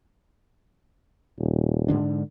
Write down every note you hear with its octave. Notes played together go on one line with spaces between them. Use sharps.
D#1
G#2 D3 D4